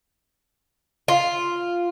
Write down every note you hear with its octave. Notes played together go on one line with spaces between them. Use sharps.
F4